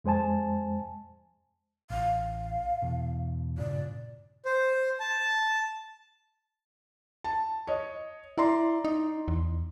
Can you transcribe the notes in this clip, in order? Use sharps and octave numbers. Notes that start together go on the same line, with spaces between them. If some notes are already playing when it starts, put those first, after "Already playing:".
F2 G#3 C5 G#5 A5
A1 F5
E2 B2
G2 A#2 C#3 D5
C5
A5
A5
C#5 D#5
E4 D5 A#5 C6
D#4
E2